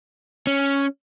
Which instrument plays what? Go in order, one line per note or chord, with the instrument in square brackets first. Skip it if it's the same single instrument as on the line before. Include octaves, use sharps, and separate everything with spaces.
[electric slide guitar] C#4